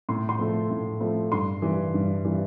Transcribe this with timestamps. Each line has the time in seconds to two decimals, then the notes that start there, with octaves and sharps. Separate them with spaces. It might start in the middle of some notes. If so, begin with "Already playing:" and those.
0.09 A2 C6
0.29 C6
0.39 F3 A3
0.70 A2
1.01 F3 A3
1.32 G2 C6
1.62 E3 G3
1.94 G2
2.25 E3 G3